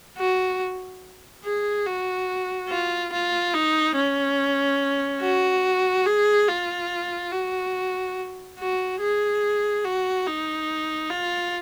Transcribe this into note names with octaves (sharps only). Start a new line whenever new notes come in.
F#4
G#4
F#4
F4
F4
D#4
C#4
F#4
G#4
F4
F#4
F#4
G#4
F#4
D#4
F4